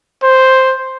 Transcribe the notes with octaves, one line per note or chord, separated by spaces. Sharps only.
C5